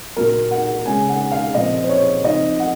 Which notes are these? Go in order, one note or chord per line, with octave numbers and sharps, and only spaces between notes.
A#2 F#3 A#3 A#4
F#5
C#3 G#3 C#4 G#5
F#5
F5
A#2 F3 C4 D#5
C5
C#5
F3 C4 D#4 D#5
F#5